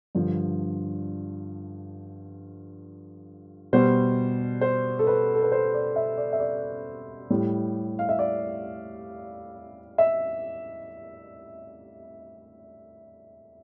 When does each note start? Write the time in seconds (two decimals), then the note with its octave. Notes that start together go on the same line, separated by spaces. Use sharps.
0.15 G2 D3 F3
3.73 B2 G3 C5
4.61 C5
4.99 A4
5.07 B4
5.34 A4
5.43 B4
5.52 C5
5.74 D5
5.96 E5
6.18 D5
6.33 E5
6.40 D5
7.30 A2 G3
7.99 F5
8.09 E5
8.19 D5
9.98 E5